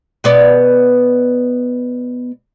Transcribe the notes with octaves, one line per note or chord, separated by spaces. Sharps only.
B2 B3 D5